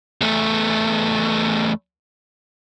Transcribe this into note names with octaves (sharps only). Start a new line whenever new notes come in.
E2 A3